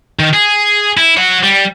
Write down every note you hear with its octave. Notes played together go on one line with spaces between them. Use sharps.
D#3
G#4
E4
C#5 F#5
G3